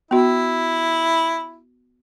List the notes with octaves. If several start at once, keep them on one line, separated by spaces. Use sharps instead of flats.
B3 E4 F#4